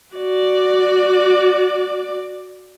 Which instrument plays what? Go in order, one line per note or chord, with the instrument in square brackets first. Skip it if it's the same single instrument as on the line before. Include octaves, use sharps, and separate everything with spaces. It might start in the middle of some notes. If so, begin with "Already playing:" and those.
[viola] F#4 D5